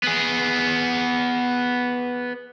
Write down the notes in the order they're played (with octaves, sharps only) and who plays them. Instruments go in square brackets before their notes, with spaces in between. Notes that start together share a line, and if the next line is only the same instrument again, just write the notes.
[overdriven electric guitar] B3 G#4